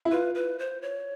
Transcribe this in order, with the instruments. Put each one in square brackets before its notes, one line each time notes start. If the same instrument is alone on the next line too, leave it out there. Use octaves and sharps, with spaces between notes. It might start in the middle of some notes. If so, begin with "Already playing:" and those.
[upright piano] E4
[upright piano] F4 [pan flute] B4
[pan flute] B4
C5
C#5